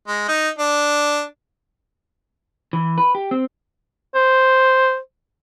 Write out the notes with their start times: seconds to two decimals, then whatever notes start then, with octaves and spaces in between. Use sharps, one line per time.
0.08 G#3
0.28 D#4
0.59 D4
2.73 E3
2.98 B4
3.15 G4
3.31 C4
4.15 C5